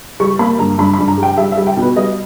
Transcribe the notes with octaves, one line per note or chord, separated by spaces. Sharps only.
G3 C#6
A#3 B5
G2 A#5
G2 B5
B5
G2
A#5
G3
G5
G3 E5
E5
G3
G5
B2 B4
G3 D#5